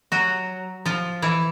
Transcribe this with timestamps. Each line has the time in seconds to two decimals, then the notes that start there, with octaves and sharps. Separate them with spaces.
0.12 F#3 F#4
0.86 F3 F4
1.22 E3 E4